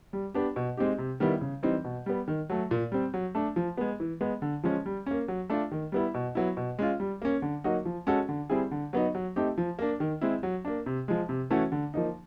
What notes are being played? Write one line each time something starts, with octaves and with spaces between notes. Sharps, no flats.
G3
B3 D4 G4
B2
G#3 C4 D#4 G4
C3
D#3 G3 B3 E4
C#3
E3 G3 C4 D#4
B2
G3 B3
D#3
F#3 A3
A#2
G3 C4
F#3
A3 D4
F3
G#3 B3
E3
G#3 B3
D3
F3 G#3 C#4
G3
A#3 C#4
F#3
A3 D4 F4
D#3
G3 B3 E4
B2
F#3 B3 E4
B2
G#3 C#4 F4
G3
A#3 C#4
D3
F#3 A#3 D#4 F#4
F3
G#3 C#4 F#4 A4
D3
G3 C4 E4 G#4
D3
F#3 B3 D#4
F#3
A3 C4 D#4 G4
F3
A#3 D4
D#3
G#3 C4 E4
F#3
A#3 D4
C3
F3 G#3
C3
E3 A3 C#4 F#4
D3
F3 A#3 D#4